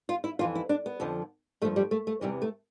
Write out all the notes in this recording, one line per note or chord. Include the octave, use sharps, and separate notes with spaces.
F4
E4
F2 E3 F4
E4
D4
B3
F2 D3 F3
G2 F3 A3
G3
A3
A3
E2 C3 E3 G3
A3